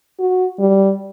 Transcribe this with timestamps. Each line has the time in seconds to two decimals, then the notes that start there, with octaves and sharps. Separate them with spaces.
0.19 F#4
0.59 G3